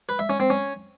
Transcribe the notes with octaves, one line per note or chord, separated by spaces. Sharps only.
B4
E5
C#4
C4
C#4